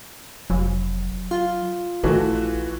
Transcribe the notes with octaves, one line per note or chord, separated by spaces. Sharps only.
F1 F#3
F4
A#1 E3 A3 F#4